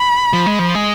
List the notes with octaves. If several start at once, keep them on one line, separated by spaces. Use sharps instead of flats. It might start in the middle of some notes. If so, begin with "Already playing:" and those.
Already playing: B5
F3
G#3
F3
G#3